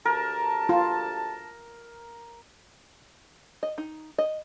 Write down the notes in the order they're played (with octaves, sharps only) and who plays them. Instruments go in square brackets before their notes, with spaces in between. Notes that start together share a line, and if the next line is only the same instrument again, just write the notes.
[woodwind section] D2 G4 A5 [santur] A#4
[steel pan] F4
[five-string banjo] D#5
D#4
D#5